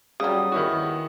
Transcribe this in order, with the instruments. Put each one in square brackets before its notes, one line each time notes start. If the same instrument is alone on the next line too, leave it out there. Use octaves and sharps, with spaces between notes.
[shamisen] C#3 F#3 [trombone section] G3 [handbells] D#6
[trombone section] D#2 B3 G#4 [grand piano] D#3 E4 F#4